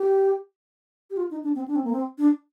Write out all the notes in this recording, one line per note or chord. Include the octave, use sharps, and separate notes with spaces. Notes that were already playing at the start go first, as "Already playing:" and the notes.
Already playing: G4
G4
F4
D#4
D4
C4
D4
C4
A#3
C4
D4